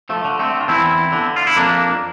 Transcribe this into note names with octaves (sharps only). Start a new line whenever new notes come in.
F3 A3
D3
A3 C4
F4
E2 C4 E4
D3
F4
E4
F2 A#3 D4